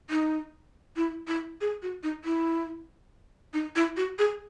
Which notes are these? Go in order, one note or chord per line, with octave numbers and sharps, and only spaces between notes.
D#4
E4
E4
G#4
F#4
D#4
E4
D#4
E4
F#4
G#4